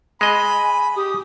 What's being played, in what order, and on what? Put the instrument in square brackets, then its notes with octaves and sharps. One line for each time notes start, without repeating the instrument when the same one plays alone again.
[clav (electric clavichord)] G#3 D#5 [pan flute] G#5 [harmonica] B5
[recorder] G4 [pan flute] D#6